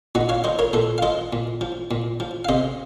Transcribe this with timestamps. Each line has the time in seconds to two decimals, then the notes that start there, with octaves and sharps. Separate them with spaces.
0.15 A#2 D#4 F#4
0.29 C#5 F5
0.44 F3 C5 D#5
0.59 A#4 C#5
0.73 A#2 A4 C5
0.98 F5
1.02 F3 C5 D#5
1.33 A#2
1.61 F3
1.91 A#2
2.20 F3
2.45 F5
2.49 C3 C5 D#5